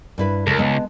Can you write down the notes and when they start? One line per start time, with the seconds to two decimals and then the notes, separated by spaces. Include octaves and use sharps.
0.18 G2 E4 B4
0.47 C#2 A4 A#4
0.59 G#3 B3 A5